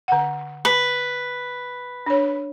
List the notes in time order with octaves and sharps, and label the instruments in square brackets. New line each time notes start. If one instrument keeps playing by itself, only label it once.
[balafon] D3 F#5
[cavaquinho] B4
[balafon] D4 C#5